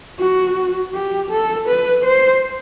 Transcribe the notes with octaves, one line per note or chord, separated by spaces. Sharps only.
F#4
G4
A4
B4
C5